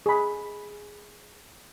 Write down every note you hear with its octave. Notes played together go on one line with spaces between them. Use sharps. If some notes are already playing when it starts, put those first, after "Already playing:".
G#4 B5